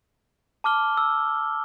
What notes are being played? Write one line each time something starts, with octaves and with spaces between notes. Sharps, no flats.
A5 D6 F6 G7
E6